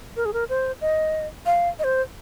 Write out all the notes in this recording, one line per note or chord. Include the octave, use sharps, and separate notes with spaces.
A#4
G#4
A#4
C5
D#5
F5
D#5
C5